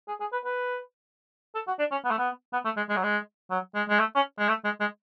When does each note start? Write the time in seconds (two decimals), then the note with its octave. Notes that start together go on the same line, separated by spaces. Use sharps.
0.08 G#4
0.20 G#4
0.32 B4
0.45 B4
1.55 A4
1.67 F#4
1.79 D4
1.92 C#4
2.04 B3
2.11 A3
2.19 B3
2.53 B3
2.65 A3
2.77 G#3
2.89 G#3
2.97 F#3
3.03 G#3
3.51 F#3
3.75 G#3
3.89 G#3
3.99 A3
4.16 C#4
4.39 G#3
4.49 A3
4.65 G#3
4.81 G#3